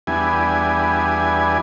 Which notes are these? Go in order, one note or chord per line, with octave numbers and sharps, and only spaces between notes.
E2 G3 B3 D4 E4 G#5